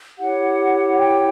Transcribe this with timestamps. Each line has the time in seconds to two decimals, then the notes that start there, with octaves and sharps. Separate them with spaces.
0.19 E4 G4 C#5 F#5
0.96 G5